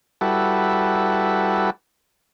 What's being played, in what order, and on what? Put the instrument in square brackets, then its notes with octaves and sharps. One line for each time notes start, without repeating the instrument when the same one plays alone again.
[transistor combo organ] G3 E4 F#4 A4 B4